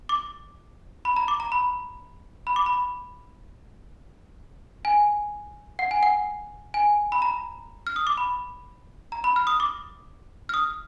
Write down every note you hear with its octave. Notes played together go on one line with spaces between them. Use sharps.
D6
B5
A#5
D6
A#5
B5
B5
D6
B5
G#5
F#5
G#5
F#5
G#5
B5
A#5
F6
D#6
D6
B5
A#5
B5
F6
D#6
D6
F6
D#6